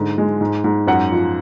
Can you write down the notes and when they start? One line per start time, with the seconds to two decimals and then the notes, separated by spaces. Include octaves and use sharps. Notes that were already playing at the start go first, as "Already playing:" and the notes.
Already playing: G#2 D3
0.18 G#3
0.41 G#2
0.64 G#2
0.87 F#2 F#5
1.12 F3